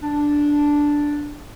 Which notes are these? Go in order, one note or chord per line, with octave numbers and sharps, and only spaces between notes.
D4